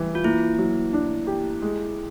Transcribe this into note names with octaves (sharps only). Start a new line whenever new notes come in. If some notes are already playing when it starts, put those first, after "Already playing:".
Already playing: E3 G3
F4
A#3 E4
F#3
D4
G4
G#3